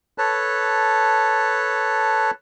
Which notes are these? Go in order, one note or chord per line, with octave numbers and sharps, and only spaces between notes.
A4 B4 C#5 A5